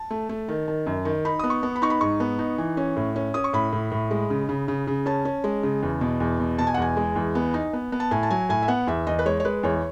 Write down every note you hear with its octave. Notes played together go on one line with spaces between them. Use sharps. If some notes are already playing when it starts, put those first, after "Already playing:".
Already playing: A5
A3
A3
D#3
D#3
F#2
D#3
D#4 B5
B3 D#6
C#6
B3
B5
D#4 C#6
B5
G#2 C#6
B3
D#4
E3
C#4
A2
C#4
C#4 D#6
C#6
A2 B5
A2
A2
G#3
C#3
C#3
C#3
C#3
C#4 A5
C#4
G#3
C#3
E2
B2
E2
B2
B2 A5
G#5
F#5
E2 G#5
G#3
E2
B3
D#4
B3
B3
A5
A2 G#5
A5
F#3 G#5
A2 G#5
E5
B3 F#5
E2 E5
E2 D#5
B4
G#3 C#5
C#5
G#3 B4
E2 C#5